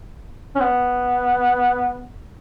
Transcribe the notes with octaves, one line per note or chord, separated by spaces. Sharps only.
C#4
B3